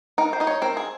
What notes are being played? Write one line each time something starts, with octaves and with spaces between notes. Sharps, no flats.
D#4 A#4
C5
D#4 D#5
C#5
C4 A#4
G#4